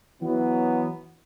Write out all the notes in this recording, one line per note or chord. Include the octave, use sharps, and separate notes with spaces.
E3 F#3 B3